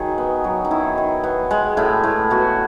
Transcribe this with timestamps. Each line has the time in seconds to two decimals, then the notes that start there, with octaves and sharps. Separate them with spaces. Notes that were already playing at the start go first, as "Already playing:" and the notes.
Already playing: D#3 F#3 G#4
0.18 B3
0.44 F#3
0.65 D#4
0.71 D#3 E4
0.98 D#3
1.24 B3
1.51 G#3
1.77 A2 E4
2.04 A2
2.30 B3 F#4